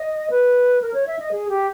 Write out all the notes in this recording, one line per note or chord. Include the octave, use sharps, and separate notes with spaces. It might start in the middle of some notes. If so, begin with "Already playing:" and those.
Already playing: D#5
B4
A#4
C#5
E5
D#5
G#4
G4